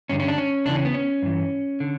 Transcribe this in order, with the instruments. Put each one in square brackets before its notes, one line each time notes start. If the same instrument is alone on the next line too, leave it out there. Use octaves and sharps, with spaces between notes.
[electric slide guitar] G2 D3 C#4
C#4
D4
C#4
E2 C#3 E3 D4
C#4
B3
C#4
G2 E3
D3